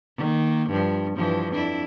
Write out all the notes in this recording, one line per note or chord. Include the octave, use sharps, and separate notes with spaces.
D#3 A#3
G2 F3
G2 E3 F3
F2 D4 E4